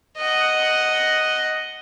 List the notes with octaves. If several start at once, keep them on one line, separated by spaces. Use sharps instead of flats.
D#5 F#5